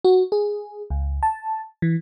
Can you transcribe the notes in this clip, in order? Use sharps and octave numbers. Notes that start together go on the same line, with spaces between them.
F#4
G#4
C#2
A5
E3